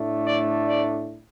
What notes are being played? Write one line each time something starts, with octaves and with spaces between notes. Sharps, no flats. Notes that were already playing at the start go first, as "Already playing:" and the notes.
Already playing: A2 A3 D4
D5
D5